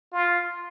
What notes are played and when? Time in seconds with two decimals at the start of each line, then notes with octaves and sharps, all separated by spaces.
0.13 F4